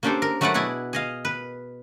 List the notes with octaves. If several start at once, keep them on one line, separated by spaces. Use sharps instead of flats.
A#3 C#4 D4 G4 A4 C5
A#4
F#3 A3 F#4 B4 D5 F#5
B2 E4 G#4 D5 F#5
G#4 D#5 F5
B4